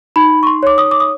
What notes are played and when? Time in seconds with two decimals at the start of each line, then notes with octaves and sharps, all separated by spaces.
0.16 D#4 B5
0.43 C#6
0.47 C6
0.63 C#5 D6
0.78 D#6
0.91 D6
1.00 D#6